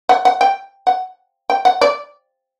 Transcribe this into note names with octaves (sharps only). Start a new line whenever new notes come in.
F#5
F#5
G5
F#5
G5
F#5
D5